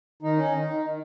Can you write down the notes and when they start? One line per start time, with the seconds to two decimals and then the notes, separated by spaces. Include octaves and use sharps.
0.22 D#3 D#4
0.37 C#4
0.52 D#3
0.68 D#3
0.83 D#3